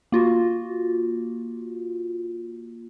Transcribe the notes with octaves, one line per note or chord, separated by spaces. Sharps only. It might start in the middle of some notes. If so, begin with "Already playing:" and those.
A#3 F4 F#4